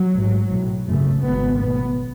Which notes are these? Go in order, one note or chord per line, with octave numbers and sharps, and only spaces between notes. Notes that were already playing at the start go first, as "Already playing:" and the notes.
Already playing: F#3
A1 G#2
B1 A2
G#1 F#2 C#3 A3
G#1 G#2 B3
B1 A2 B3